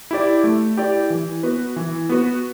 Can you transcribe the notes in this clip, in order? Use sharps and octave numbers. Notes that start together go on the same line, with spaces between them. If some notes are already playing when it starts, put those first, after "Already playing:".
E4 G4 D5
A3
E4 G4 D5
E3
B3 F#4 B4
E3
B3 F#4 B4